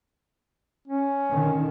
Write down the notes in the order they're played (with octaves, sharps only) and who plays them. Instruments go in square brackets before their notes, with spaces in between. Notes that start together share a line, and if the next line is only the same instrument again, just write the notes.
[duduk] C#4
[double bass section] D3 D#3